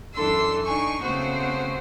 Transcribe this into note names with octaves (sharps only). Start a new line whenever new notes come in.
F#2 E3 D4 A4 C6 E6
D4 D#4 G#5 C#6
C#3 A3 B3 C4 F#4 C5